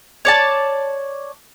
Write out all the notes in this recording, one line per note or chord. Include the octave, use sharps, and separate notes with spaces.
C#5 D5 A5